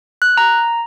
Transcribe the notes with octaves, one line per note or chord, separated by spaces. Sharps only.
F#6
A#5